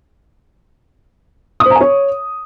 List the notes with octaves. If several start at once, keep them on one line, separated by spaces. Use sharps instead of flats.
D#6
C5
A#5
G#5
C#5